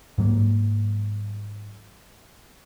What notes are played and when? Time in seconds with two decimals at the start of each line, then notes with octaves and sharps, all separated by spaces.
0.18 G#2 F#3 A#3